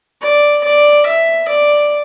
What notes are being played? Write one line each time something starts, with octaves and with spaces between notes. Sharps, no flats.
D5
D5
E5
D5